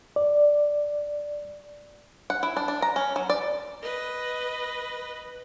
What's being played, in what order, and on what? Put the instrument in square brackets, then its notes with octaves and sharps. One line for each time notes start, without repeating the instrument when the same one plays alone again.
[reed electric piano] D5
[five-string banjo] F#5
E4
D4
D4
A#5
C#4
F#3
D5
[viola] B4 D#5